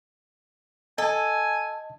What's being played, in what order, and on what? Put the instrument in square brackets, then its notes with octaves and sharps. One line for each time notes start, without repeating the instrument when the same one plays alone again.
[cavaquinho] A4 [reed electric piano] D#5 A5 [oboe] G#5